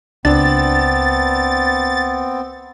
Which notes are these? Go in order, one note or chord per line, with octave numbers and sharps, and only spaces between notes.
C#2 B3 C4 D4 A6